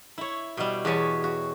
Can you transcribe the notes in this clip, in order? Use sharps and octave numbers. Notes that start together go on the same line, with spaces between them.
E4 C#5
B2 G3
E2 F#4 G4 C#5 G#5 A5
F#4